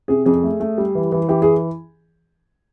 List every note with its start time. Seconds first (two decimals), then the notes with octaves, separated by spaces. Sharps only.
0.08 C3 G#4
0.26 F2 G#4
0.44 A3
0.60 A3
0.78 G3
0.95 E3
1.12 E3
1.28 E3 G4
1.42 G#4